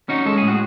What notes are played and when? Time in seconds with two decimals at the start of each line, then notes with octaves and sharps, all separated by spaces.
0.09 C#4 D#4 F#4
0.26 G#3 A4
0.38 A2 G#4
0.48 F#4